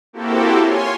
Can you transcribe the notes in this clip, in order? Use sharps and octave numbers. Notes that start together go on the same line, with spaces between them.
A#3 C4 E4 F#4 G4 A4
F4 C#5 G#5 C6